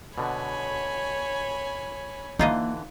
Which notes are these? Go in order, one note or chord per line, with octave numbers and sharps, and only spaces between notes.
B2 D3 C#5 G#5 B5
D3 E3 A#3 D#4 F4 D#5